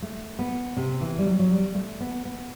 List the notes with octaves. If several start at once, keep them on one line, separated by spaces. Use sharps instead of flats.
A3
B3
C3
E3
G3
F#3
F#3
G3
A3
B3
B3